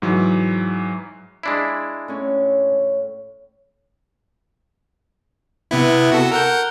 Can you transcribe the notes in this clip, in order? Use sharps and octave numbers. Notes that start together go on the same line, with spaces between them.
G#2 E3 F#3
G#3 D4 E4
A2 C#4
C3 B3 E4
F#4 A4
A#4 F#5 G6